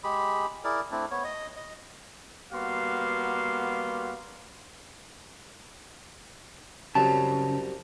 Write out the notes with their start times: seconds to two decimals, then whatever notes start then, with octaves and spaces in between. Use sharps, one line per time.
0.04 G#3 G4 G#4 B5
0.64 E4 G#4 A#4 D5
0.92 A3 C4 D4 E4
1.11 B3 C#5
1.24 D#5
1.56 D#5
2.52 G3 A#3 B3 F#4 F5 C6
6.95 C2 F#2 C#3 F#3 A5